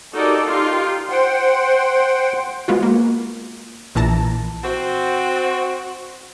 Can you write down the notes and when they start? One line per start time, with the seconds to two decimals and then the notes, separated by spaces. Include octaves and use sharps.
0.14 D#4 F#4 G4 A4 A#4 D5
0.45 D#4 F4 G4
1.10 C5 F#5 G5 C6
2.68 G#3 B3 F4 F#4
2.83 A#3
3.95 A#1 A#2 E3 A5 A#5 A#6
4.64 C4 F#4